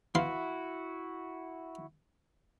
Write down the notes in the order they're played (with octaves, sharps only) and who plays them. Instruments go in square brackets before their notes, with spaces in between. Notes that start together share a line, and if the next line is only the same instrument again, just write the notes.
[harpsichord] E3 F5 C6 [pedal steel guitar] E4 F#4